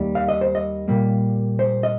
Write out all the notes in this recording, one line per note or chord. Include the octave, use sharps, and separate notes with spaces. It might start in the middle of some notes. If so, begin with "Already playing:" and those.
Already playing: D#2 D#3 G3 A#3
F5
D#5
C5
D#5
A#2 G3 A#3
C5
D#5